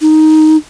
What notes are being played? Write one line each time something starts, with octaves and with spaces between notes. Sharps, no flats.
D#4